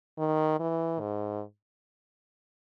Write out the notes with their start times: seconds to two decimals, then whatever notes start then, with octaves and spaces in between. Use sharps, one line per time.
0.19 D#3
0.60 E3
1.00 G#2